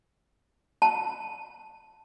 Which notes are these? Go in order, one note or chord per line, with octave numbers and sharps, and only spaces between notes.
A5